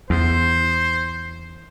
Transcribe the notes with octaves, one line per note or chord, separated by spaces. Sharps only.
E2 C5